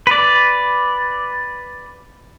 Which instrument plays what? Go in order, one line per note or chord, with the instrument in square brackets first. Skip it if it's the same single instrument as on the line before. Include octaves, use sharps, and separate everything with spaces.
[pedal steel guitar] B4 D5